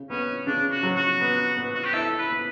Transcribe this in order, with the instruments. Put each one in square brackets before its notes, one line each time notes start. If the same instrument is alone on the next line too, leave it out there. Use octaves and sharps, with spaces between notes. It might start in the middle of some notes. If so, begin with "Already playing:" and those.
Already playing: [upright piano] C#3
[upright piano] B3 [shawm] C#4
[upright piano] C#3 [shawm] D4
[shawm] F#4
[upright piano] F#3
[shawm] F#4
[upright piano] B3
B3
[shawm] F#4
G4
[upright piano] E4 [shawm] A4
[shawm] B4
[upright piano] B3